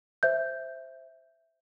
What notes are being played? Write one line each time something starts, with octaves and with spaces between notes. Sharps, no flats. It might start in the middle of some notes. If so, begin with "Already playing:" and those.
C5 E5 G6